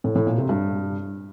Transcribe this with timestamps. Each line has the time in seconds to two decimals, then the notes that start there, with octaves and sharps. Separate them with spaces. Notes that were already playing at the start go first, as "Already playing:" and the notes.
0.04 A2
0.15 A2
0.27 A#2
0.38 C3
0.49 G2